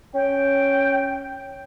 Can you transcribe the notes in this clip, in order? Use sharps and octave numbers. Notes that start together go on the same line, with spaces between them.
C#4 G5